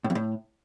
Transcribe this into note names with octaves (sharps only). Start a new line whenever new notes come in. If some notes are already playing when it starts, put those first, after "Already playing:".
A2
F2
A2